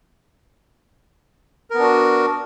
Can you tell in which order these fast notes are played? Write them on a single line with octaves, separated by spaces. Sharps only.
A#4 B3 D4 F#4